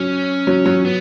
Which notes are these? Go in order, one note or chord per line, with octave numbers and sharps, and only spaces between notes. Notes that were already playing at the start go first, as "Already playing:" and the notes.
Already playing: F#3 C#4
F#3
F#3
B3